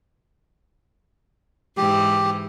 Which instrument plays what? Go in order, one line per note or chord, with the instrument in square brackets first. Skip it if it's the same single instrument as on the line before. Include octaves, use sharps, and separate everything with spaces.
[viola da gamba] G#2 E3 [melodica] G4